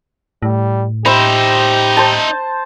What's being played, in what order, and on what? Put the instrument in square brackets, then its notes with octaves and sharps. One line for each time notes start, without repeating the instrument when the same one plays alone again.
[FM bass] A2 [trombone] G3
[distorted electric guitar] D#4 E5 [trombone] G4 [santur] C5 B5 C6
[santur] C5 A5